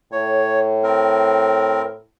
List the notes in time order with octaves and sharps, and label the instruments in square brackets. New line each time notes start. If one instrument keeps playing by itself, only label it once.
[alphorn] A2 [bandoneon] C#5
[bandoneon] C4 A#4